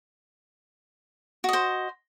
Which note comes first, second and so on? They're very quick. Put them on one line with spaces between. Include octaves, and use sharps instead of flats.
F#4 D#5 C5